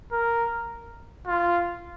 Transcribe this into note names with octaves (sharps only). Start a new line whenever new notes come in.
A#4
F4